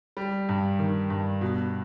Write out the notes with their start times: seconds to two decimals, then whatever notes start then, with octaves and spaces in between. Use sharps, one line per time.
0.17 G3
0.49 G2
0.79 D#3
1.10 G2
1.41 B2